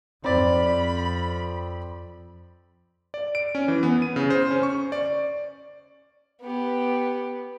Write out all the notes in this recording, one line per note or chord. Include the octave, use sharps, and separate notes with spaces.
F2 C4 D5 B5
D5
D7
C#4
E3
B3
D#7
C#3
C5
C#4
C#6
D5
B3 G4